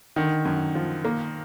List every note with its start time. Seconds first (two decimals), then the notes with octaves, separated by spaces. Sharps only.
0.16 D3 D#3
0.45 F#2
0.75 F3
1.05 A#3